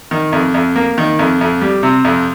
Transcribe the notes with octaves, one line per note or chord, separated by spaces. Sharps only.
D#3
F2
F2
A#3
D#3
F2
F2
G3
C3
F2